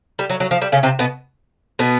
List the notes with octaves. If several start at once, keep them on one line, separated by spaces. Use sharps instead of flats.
G3
F#3
F#3
F3
G3
C#3 C#4
C3 C4
B2 B3
B2 B3